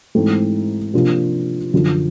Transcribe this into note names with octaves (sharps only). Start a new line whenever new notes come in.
G#2 E3 A3 C4
C3 F3 A#3 D4 F4
F#2 D3 F3